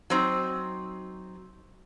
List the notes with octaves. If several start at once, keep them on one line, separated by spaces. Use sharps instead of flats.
F#3 C4 D#4